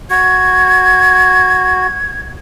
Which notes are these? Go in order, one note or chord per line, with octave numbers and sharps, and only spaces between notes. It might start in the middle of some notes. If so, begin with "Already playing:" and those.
F#4 G#6